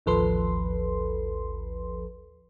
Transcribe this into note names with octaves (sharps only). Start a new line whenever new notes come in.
A1 D#2 F3 A4 B4 C6